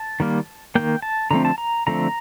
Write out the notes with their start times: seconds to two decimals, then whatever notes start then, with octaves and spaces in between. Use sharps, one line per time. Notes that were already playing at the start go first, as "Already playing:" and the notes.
Already playing: A5
0.20 D#3 G3 A#3
0.75 D#3 G3 A#3 G5
1.02 A5
1.31 D3 F3 A3 C4 A#5
1.45 A5
1.58 A#5
1.87 D3 F3 A3 C4 A#5